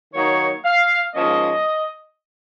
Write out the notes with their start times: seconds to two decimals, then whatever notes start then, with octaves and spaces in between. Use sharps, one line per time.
0.13 D#3 F#3 A#3 D#4 C#5
0.64 F5
1.14 G#2 F3 A#3 C#4 D#5